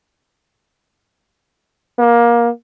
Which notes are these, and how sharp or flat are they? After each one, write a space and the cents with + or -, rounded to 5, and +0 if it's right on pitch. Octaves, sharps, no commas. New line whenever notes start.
A#3 +20